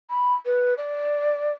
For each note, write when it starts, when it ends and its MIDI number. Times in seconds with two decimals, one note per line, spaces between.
0.10 0.34 83
0.46 0.74 71
0.77 1.53 74